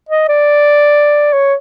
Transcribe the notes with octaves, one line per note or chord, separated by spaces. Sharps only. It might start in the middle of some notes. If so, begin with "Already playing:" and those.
D#5
D5
C#5